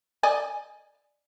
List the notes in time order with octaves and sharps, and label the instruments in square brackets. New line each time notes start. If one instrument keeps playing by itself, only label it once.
[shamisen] D5 D#5 G#5